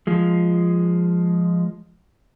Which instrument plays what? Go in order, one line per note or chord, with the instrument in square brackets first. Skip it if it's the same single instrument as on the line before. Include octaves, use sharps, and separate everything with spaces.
[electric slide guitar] F3 G#3